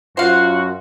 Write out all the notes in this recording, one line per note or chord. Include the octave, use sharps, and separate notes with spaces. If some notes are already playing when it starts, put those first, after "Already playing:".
F#2 F4 F#4 C5 F5